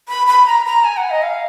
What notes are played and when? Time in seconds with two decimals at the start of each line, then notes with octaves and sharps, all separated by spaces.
0.08 B5
0.27 B5
0.46 A#5
0.66 A#5
0.84 G#5
0.97 F#5
1.10 D#5
1.22 F5